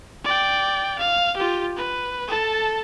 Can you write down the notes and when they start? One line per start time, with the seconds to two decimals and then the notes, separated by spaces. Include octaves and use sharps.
0.24 D5 G5
0.99 F5
1.37 F4 G4
1.77 B4
2.28 A4 A5